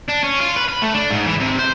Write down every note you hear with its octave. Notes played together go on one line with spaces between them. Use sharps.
D4
C#4
F4
B4
B5
A3
D4
G#2
E3
C3
C5